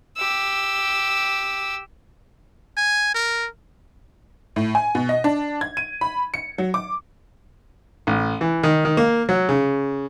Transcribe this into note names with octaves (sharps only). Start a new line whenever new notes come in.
G4 E6
G#5
A#4
A2
G#5
B2
D#5
D4
G#6
D#7
B5
C#7
F#3
D6
A1
E3
D#3
D#3
A#3
F#3
C#3